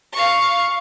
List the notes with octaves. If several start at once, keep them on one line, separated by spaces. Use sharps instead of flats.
F5 C#6